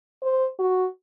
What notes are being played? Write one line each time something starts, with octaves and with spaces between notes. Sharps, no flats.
C5
F#4